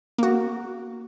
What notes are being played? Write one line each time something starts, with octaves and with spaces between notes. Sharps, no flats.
A#3 F#4